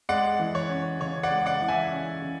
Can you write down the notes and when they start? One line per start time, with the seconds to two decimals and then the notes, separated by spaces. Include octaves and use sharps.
0.09 G#3 D5 F#5
0.39 E3
0.55 C#5
0.70 C#4
1.00 C#3 C#5
1.23 D5 F#5
1.31 G#3
1.46 D5 F#5
1.61 E3
1.68 E5 G#5
1.91 C#4
2.22 C#3